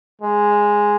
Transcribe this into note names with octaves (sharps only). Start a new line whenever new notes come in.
G#3